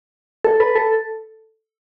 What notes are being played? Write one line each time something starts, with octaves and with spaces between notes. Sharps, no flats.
A4
B4
A4